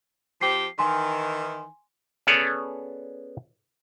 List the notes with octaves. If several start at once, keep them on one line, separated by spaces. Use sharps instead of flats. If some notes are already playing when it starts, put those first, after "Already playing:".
F3 C4 G4 C7
D#3 E3 G#5 C6
B3 C#4 G#4 A4 C#5 D5